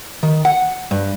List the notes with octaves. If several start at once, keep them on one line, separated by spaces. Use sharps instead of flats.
D#3
F#5
G2